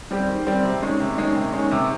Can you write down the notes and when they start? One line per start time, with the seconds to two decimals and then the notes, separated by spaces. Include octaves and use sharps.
0.11 G3 C4 G4
0.28 D#3
0.46 G3 C4 G4
0.64 C3
0.82 D#3 G#3 C#4
1.00 C3
1.17 D#3 G#3 C#4
1.36 C3
1.52 D#3 G#3 C#4
1.71 C3